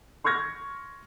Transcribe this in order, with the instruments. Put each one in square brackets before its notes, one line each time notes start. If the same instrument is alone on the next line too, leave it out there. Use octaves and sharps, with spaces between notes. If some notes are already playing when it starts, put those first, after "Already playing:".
[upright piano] C6 C#6 F6 G#6 A#6